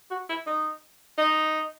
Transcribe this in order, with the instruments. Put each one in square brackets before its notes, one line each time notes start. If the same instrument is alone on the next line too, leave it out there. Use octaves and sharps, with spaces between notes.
[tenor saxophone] F#4
E4
D#4
D#4